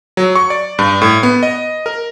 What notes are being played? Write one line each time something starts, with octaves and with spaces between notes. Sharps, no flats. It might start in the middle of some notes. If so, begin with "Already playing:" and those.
F#3
C#6
D5
G2
A2
B3
D#5
A#4